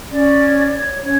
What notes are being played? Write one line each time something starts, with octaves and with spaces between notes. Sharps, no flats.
C#4 D5
C#5
C#5
C#4 C#5